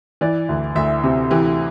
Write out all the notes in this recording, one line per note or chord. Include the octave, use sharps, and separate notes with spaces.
E3 D5
D2
D2 E5
C3
E3 G4